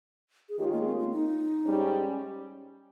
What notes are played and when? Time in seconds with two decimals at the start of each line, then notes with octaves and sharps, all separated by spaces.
0.49 G#4
0.59 D#3 G#3 C#4 F4 G4
0.73 A#3
0.86 C4
0.99 A#3
1.13 D#4
1.66 G#2 G3 C#4